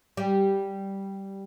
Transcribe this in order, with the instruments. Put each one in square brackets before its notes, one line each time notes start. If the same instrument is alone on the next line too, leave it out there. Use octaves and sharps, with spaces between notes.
[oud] G3